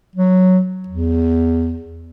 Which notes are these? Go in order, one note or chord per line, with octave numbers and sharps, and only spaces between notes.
F#3
E2